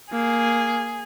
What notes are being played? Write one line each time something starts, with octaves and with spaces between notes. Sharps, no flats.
A#3 G#4